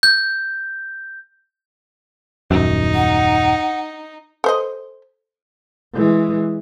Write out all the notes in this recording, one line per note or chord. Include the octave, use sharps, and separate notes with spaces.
G6
D#1 F#2 D#4
F#5
A4 C5 D#5
E3 G#3